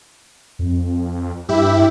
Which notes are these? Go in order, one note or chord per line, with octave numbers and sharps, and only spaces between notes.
F2
G2 E4 G4 E5